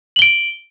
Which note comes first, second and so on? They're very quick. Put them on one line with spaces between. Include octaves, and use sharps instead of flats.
F#7 G7 D7